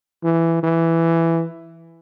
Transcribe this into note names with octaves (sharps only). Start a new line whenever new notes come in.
E3
E3